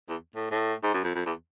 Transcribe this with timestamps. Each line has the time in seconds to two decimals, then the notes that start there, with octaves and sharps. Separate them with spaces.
0.09 E2
0.35 A2
0.51 A2
0.83 G#2
0.94 F#2
1.04 F2
1.15 F2
1.26 E2